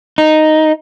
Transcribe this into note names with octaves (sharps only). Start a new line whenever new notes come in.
D#4